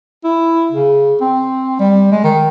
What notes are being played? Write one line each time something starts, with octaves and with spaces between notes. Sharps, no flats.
E4
C#3
C4
G3
G#3
D#3